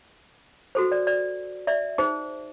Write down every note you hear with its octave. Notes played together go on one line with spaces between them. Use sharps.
F#4 A4 C5
D5
D5
D5 E5
D#4 G#4 C5